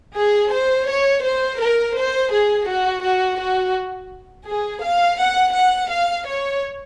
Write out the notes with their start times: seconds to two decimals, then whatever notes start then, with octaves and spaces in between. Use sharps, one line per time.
0.16 G#4
0.51 C5
0.88 C#5
1.24 C5
1.60 A#4
1.96 C5
2.32 G#4
2.68 F#4
3.04 F#4
3.40 F#4
4.48 G#4
4.84 F5
5.20 F#5
5.55 F#5
5.92 F5
6.28 C#5